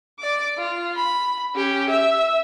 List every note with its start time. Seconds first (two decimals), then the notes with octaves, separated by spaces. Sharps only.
0.20 D5 D6
0.58 F4
0.96 B5
1.55 C#4 G4
1.90 E5